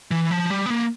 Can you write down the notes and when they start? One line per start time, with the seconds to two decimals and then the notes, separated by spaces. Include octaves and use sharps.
0.11 E3
0.31 F3
0.50 G3
0.66 B3
0.70 A#3